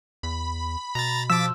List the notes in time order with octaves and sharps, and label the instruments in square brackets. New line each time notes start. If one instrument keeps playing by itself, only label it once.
[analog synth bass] E2 [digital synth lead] B5
[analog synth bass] B2 [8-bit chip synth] A#5 A6
[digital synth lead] F3 [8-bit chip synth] D6 A6 B6 [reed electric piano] E6